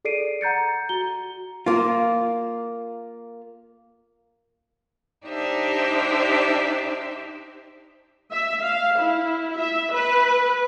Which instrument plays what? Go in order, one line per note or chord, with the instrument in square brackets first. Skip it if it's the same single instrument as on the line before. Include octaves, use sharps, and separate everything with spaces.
[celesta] G#4 A4 D5 C7 D7 D#7
F#5 A#5 G6 A6 C#7
F#4 A#5 G7
[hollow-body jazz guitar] A#3 F4
[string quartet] D4 D#4 G4 C5 D5 E5
[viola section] E5
F5
E4
E5
B4